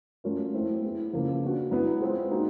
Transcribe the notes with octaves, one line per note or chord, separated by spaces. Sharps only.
F#3 A3 C#4 F4 A#4
F#3 A3 C4 E4
B3 E4 G#4
C#3 F3 A#3
B3 D4 F#4
F#3 B3 E4
G#3 C4 F4
A#3 D#4 F#4